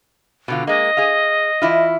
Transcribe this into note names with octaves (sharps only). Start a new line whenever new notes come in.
B2 D3 F4
G#3 A#3 D#5
G#4 F5
E3 E4 F4